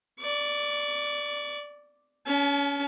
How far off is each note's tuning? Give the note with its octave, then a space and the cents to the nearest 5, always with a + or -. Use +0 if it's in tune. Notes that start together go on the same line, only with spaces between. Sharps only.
D5 +0 C#6 +45
C#4 +25 A5 -40